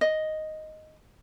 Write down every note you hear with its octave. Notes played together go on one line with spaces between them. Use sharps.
D#5